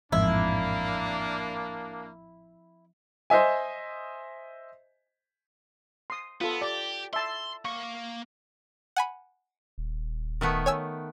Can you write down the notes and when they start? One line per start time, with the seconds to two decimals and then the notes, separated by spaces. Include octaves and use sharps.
0.12 A1 F2 G#2 F3 A#3 C4 D4 E4
3.30 C5 D#5 E5 G#5
6.10 C6 D#6
6.41 B3 F4 A4
6.61 G4 D5
7.13 E5 A5 C6
7.65 A#3 C#6
8.96 F#5 G#5 B5
9.78 D#1
10.41 D#3 A3 B3
10.66 C#5 G#5 E6